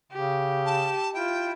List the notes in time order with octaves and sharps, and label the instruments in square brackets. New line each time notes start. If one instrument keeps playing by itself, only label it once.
[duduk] C#3 [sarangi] G4
[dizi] A5
[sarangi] E4 [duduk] F4 [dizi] G5